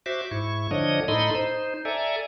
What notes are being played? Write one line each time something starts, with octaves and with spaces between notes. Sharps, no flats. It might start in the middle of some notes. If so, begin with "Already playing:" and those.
F#4 C5 E5 D6
G#2 E4 C#6
D3 F3 D4 C#5 D#5 D#6
A2 D#4 A4 D#5 B5 C6
D#4 C5
A4 D5 E5 G#5 A#5